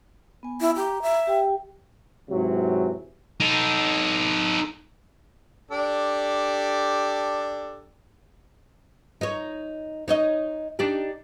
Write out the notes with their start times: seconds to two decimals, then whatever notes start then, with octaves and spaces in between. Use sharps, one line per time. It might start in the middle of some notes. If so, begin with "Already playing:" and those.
0.43 B3 G#5
0.61 E4
0.76 G4 A#5
1.02 E5
1.27 G4 G5
2.30 G#2 C3 E3 F#3
3.40 D#4 A4
5.71 D4 G4 A4
9.21 D#4 C#5
10.08 D#4 C#5 D#5
10.79 D4 D#4 G4